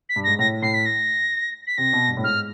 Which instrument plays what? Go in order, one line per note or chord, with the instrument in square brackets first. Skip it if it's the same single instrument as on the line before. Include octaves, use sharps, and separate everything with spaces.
[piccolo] B6
[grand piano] G2
[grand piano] G#2 [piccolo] A#6
[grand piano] A2 [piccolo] A#6
[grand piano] A2 [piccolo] C7
[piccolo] B6
A#6
B6
[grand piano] C3 [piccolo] A#6
[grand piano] B2
G2
A2
[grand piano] G#2 [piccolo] F6